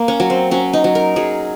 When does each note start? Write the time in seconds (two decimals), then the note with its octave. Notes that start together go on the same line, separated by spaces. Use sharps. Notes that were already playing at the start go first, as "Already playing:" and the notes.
Already playing: A#3
0.08 C#4
0.20 F#3
0.30 C4
0.51 F#3 C#4
0.73 D#4
0.84 F#3
0.95 A#4
1.16 F#3 G#4